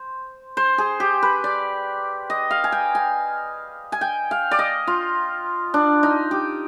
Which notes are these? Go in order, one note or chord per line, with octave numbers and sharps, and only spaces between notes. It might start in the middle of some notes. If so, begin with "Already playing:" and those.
Already playing: C5
C5
G#4
G4
B4
D5
D#5
F5
G#5
G5
G#5
G#5
G5
F5
D5
D#5
F4
D4
D#4
G4